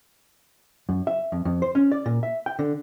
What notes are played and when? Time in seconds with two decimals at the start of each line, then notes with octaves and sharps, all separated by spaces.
0.89 F#2
1.07 E5
1.32 F2
1.45 F2
1.62 C5
1.75 C#4
1.92 D5
2.06 A#2
2.23 E5
2.46 G5
2.59 D3